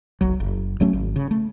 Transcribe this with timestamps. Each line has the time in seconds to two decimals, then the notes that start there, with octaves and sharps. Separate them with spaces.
0.21 F1 B1 F#3
0.40 F#1
0.80 D1 F#3 A3 C#4
0.93 G#1
1.16 C#3
1.31 A3